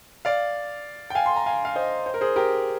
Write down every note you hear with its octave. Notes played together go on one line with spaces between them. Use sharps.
D5 F5
G5
F5 G#5
C6
A#5
F5 G#5
F5
C5 D#5
C5
A#4
G#4 C5
G4 A#4